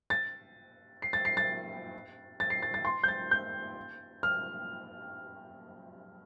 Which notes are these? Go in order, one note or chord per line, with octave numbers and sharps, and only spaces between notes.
A6
C7
A6
C7
A6
A6
C7
A6
A6
C6
G6
A6
G6
F6